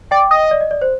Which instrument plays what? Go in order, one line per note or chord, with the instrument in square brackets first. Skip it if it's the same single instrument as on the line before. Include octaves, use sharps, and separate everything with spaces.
[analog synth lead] D5 [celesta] G5
[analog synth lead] D#5
[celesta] D5
D#5
D5
C5